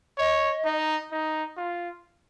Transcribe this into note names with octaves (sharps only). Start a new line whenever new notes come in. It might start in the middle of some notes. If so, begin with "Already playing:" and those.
C#5 D#5
D#4
D#4
F4